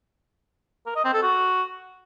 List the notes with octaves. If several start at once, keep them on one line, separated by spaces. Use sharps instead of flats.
A#4
D#5
C4
A4
F#4